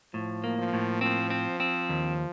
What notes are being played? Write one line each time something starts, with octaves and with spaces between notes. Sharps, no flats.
A2 F3
A#3
F3
A2
F3 C4
C4
C4
D#2